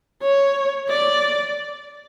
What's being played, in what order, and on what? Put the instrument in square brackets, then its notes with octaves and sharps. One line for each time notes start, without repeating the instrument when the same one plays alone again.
[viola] C#5
D5